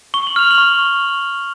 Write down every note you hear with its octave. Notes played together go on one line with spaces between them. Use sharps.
C#6 G7
F#7
F6 F7
F#7
C#6